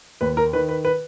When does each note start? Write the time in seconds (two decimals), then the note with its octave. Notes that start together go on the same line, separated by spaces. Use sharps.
0.21 D#2 B4
0.37 A#4
0.53 D#3 B4
0.69 B4
0.85 B4